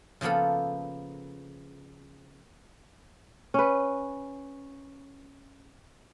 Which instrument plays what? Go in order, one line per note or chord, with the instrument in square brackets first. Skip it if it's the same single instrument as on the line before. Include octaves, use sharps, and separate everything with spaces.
[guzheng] C#3 F3 A#3 B3 A4
[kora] C#4 B4